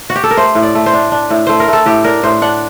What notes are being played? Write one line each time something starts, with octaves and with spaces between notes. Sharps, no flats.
F#4
G4
A4
A#4
A3 C5
A2
D5
A3
C5
D4
D4
A2
A3 C5
A#4
A3 A4
A2 G4
D4 A#4
A2 C5
D4 F#5